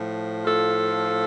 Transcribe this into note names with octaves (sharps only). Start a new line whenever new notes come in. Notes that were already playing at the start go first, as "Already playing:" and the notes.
Already playing: A2 F3
F4 A4